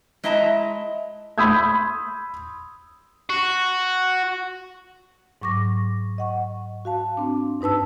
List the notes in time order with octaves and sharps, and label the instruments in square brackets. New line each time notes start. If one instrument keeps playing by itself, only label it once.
[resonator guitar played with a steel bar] G#3 E4 D#5 E5 A5 A#5
[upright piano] B5 C6 D#6 E6 G6 G#6
[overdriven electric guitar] F#4
[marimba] G#2 F#3 C#6 D6 A#6
D#5 F#5 C#6
F#4 F5 A5
C4 D4
G2 D#4 B4 A5 E6